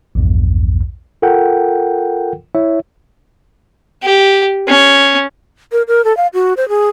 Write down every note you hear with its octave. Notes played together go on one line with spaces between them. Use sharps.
A#1 E2 G2
F4 A4 A#4 F#5 G5
E4 C#5 E5
G4
C#4
A#4
A#4
A4
F5
F#4
C5
G#4